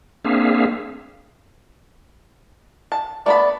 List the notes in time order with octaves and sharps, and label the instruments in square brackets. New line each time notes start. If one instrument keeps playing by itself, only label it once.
[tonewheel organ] A#3 C4 D4 G#4 E5 F5
[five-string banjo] A5
[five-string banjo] A3 B3 B5 [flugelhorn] D5